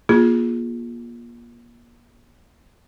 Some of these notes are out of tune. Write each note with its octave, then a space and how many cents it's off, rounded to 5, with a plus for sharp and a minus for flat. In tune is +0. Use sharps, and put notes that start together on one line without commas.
A#3 +35 F4 +5 G#4 +0